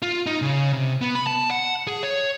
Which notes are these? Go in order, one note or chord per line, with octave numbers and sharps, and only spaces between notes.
F4
D#4
C#3
C3
B3
B5
A5
F#5
G#4
C#5